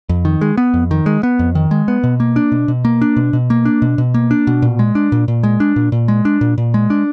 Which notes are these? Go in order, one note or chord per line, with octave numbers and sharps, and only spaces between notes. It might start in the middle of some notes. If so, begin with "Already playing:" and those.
F2
D#3
G#3
B3
F2
D#3
G#3
B3
F2
D#3
G#3
B3
B2
A#3
D4
B2
B2
A#3
D4
B2
B2
A#3
D4
B2
B2
A#3
D4
B2
A#2
G#3
D4
A#2
A#2
G#3
D4
A#2
A#2
G#3
D4
A#2
A#2
G#3
D4